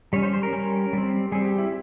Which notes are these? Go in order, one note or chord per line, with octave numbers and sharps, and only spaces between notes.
G3 C#4 C#5
C5
C5
A#4
G3 C#4
G3 C4
G3 C4 G#4
G4
E4